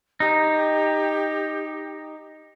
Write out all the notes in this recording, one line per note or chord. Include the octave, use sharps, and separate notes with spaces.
D#4 G4